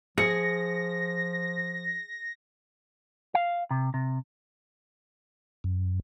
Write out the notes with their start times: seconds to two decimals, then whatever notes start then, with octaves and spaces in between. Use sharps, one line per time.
0.18 F3 G#4 A#6 C#7
3.35 F5
3.71 C3
3.94 C3
5.64 F#2